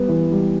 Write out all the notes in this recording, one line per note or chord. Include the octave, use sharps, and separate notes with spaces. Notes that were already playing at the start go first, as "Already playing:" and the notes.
Already playing: G3 B3
E3
G3